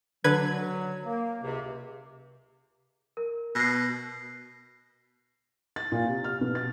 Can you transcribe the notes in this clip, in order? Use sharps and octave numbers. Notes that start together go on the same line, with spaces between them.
D3 F#3 B4 G#6
A#3
C#2 C3
A#4
B2 A#6 C7
A6
A#2
C3
F6
B2
A6